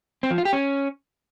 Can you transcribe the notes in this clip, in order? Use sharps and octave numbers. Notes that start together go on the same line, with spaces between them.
C4
F3
F4
G4
C#4